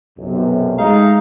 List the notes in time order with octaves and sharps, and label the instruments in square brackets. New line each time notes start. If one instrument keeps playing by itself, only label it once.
[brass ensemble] B1 F#2 C3
[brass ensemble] G#3 A3 [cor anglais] D#4 [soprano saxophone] F5